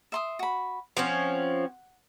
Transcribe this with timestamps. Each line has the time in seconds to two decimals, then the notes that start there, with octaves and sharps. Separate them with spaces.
0.12 E5 C6 D#6
0.39 F#4 B5
0.97 F3 C4 C#4 F#5